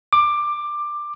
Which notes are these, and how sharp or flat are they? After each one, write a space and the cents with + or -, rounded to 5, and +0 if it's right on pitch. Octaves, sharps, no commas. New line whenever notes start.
D6 +15